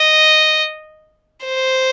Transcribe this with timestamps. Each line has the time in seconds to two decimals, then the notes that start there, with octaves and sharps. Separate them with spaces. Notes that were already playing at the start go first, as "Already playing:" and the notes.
Already playing: D#5
1.45 C5